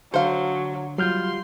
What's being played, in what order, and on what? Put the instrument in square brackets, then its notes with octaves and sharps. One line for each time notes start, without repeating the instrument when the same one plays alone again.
[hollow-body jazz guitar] D3 A4 [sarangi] F#3 [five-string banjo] C5 F5
[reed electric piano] F#3 F6 G6 [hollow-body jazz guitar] G3 F4 [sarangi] C6